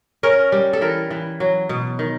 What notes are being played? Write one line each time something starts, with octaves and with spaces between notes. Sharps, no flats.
C#4 A#4
G3
A4
E3 A#4
E3
F#3
B2
D#3